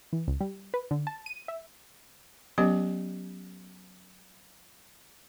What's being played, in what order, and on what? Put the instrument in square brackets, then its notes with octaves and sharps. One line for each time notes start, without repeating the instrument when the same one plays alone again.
[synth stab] E3
C#2
G3
B4
D3
A5
D#7
E5
[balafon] F#3 B3 C#4 G4 D#5